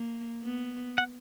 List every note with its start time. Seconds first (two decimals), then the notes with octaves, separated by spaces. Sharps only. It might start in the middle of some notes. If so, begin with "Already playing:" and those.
Already playing: A#3
0.43 B3
0.98 F#5